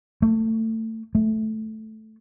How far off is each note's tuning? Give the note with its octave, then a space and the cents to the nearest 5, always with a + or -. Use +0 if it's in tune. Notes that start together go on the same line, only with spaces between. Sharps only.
A3 +25
A3 -10